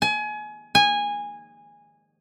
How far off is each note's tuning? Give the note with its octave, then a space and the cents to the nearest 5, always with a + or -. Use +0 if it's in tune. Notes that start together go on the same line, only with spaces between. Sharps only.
G#5 +30
G#5 -15